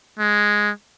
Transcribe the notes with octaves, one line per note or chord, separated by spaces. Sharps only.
G#3